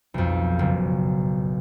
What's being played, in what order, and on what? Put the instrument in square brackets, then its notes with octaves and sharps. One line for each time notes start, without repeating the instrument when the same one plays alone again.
[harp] B1 F2
F#1